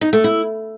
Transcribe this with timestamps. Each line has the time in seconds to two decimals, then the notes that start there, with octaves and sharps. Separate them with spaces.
0.01 D#4
0.13 A3
0.24 E4